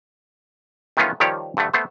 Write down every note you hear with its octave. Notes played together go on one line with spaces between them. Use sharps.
D#3 E3 A3 B3 C#4 F4
D#3 F3 G3 G4 C#5 D5
G2 D3 A3
A3 B3 C5